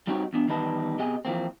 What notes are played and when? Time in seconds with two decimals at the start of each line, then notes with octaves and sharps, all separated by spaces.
0.07 G3 C4 D#4 F#4 G4 C#5
0.33 E2 B3 D4
0.48 E2 D#3 G3 B4 D#5 A5
0.99 C3 B3 G4 G#4 D#5 G#5
1.25 E3 F3 A#3 C4